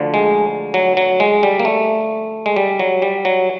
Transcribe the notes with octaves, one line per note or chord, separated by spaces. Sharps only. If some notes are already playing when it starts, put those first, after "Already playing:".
Already playing: D2 D3 F3
G#3
F#3
F#3
G#3
G3
A#3
A3
G#3
G3
F#3
G3
F#3